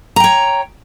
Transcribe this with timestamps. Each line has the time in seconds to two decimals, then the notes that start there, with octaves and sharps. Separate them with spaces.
0.16 A#5
0.20 G5
0.24 C#5